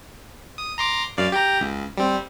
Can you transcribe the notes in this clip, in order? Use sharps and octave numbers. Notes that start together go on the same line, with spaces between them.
D#6
A#5 C6 D6
F#2 D5 F5
G4 G5 A#5
C#2
G3 C4